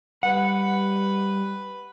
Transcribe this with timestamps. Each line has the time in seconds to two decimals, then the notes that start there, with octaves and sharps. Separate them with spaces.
0.23 G3 B4 F#5